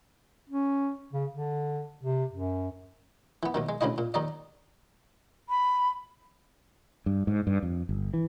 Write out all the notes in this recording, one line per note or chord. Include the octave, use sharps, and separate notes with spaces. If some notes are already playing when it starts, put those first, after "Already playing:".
C#4
C#3
D3
C3
F#2
E3 B3
D#2 B2 D#3
G#3
D2 C#3 C4 E4 D#5
A#2
D#2 D#3 D#4 D5 D#5
B5
G2
G#2
G2
F2
G1
E3